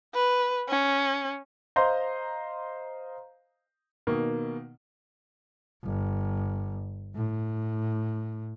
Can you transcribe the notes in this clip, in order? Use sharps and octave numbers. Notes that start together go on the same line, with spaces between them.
B4
C#4
C5 D#5 F5 A#5 C6
B2 D#3 A#3
G1
A2